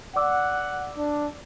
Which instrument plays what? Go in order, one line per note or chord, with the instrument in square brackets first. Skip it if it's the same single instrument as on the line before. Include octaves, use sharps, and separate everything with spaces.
[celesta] D5 D6 E6 [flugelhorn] F#5
[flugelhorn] D4